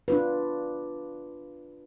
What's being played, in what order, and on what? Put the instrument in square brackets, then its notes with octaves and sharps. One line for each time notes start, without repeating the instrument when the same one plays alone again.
[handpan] D4 F4 B4